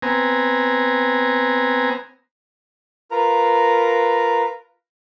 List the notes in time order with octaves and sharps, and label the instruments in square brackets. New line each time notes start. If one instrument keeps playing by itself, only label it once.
[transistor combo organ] B3 C4 G#5 A#5
[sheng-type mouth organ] F4 A#4 B4 A#5